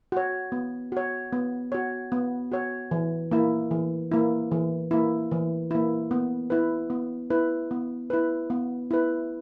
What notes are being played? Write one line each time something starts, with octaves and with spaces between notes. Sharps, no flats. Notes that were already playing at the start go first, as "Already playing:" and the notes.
F#4 C#5
B3
F#4 C#5
B3
F#4 C#5
B3
F#4 C#5
E3
A#3 E4
E3
A#3 E4
E3
A#3 E4
E3
A#3 E4
B3
E4 B4
B3
E4 B4
B3
E4 B4
B3
E4 B4